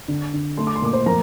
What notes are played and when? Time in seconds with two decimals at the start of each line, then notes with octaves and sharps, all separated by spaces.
0.08 D3
0.33 D3
0.57 A3 C6
0.67 D6
0.76 C6
0.82 A#2 D6
0.93 C5 C6
1.06 F3 A#4 A#5